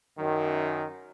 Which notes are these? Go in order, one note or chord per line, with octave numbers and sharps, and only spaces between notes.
F#2 D#3